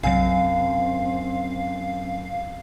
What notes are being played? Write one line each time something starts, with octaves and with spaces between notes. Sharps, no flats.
B1 F#2 C3 F#3 C4 F5